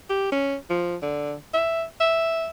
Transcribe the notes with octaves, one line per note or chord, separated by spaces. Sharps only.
G4
C#4
F3
D3
E5
E5